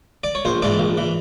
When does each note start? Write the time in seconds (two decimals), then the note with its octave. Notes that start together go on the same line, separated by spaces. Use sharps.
0.24 D5
0.35 C#5
0.45 A#1 C5
0.62 G#2 E3 D5
0.79 A#1
0.97 E3